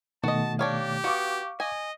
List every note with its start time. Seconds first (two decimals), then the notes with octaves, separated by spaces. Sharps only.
0.24 B2 D#3 A3 F#4 D#5 A5
0.59 D4 G4 C#5 F5
1.04 B3 F#4 F5 C#6 D6
1.60 D#5 G#5